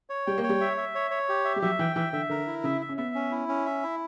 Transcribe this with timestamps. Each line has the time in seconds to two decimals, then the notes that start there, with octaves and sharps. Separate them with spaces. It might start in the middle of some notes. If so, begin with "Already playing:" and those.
0.10 C#5
0.27 G3 G5
0.38 A#3
0.43 C#5
0.49 G3
0.61 E5
0.77 E5
0.95 C#5
1.11 C#5
1.29 G4
1.45 E5
1.56 G3
1.62 F#3 E5
1.79 E3 G5
1.96 E3 E5
2.13 D3 E5
2.29 D3 A#4
2.47 E4
2.64 C#3 E5
2.81 E5
2.89 C#4
2.97 B3 E5
3.15 C#4
3.31 E4
3.49 C#4
3.66 E5
3.83 E4